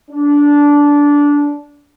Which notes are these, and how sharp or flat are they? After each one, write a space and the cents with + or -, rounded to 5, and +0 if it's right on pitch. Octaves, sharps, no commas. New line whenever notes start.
D4 -15